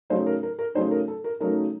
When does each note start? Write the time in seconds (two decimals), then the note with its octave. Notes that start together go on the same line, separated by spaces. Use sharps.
0.10 C#3 F#3 A3 D#4 C5
0.26 A#4
0.43 A#4
0.59 A#4
0.75 C#3 F#3 A3 D#4 C5
0.91 A#4
1.08 A4
1.24 A#4
1.40 C#3 F#3 A3 D#4 A#4